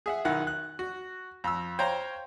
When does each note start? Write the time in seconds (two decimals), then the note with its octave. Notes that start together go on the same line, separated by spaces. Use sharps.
0.06 G#4 E5 F#5
0.25 B1 D#3 E4 F#5 F#6
0.47 F#6
0.79 F#4
1.44 F2 E6
1.79 C5 C#5 F5 G5 A#5